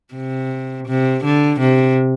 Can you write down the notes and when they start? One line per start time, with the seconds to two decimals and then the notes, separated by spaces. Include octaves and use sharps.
0.14 C3
0.87 C3
1.24 D3
1.60 C3